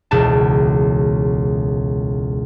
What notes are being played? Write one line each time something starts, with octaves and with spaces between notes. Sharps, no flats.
E1 C#2 B2 A5